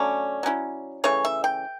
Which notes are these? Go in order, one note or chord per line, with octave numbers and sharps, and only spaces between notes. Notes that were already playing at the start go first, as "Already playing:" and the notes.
Already playing: D3 F#3 A3 C#4 D5
F#3 C#4 E4
C#3 E3 A3 C#5
E5
G5